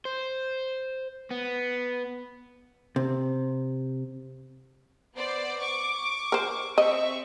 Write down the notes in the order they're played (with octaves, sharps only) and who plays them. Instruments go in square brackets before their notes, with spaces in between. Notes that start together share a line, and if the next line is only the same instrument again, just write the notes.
[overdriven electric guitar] C5
B3
[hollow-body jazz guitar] C3
[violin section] B3 C5 D5
C#6 D6
[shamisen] A#4 C5
[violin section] C4 E5 C#6 [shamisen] D#5